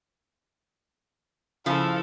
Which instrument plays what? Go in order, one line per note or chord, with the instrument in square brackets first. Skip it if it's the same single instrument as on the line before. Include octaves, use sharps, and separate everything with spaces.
[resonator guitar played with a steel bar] C#3 F3 [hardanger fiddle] E4 A4 [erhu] F5